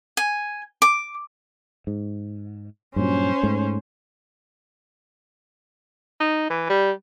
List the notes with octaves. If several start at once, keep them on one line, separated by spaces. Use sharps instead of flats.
G#5
D6
G#2
G2 A#2 F#3 C#4 C5
G#2 A3
D#4
E3
G3